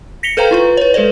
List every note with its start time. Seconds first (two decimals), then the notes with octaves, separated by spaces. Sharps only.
0.23 A#6 B6 C#7 F7 G7
0.37 A4 B4 C5 F5 G5 A#5
0.51 E4 F4 B4
0.77 B4 C#5
0.94 G#3 A4 B4 C5 D5